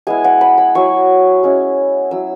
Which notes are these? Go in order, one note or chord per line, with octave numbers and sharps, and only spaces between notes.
G#3 B3 E4 G#5
F#5
B5
B5
F#3 E4 C#6
G#3 C#4 E4
F#3 E4 E6